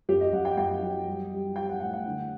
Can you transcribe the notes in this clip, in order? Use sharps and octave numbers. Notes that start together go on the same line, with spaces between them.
F#2 G4
D#5
F#2 F#5
G5
F#2 G5
F#3
G3
G3
G3 G5
F#5
A2 F#5
F#5
D3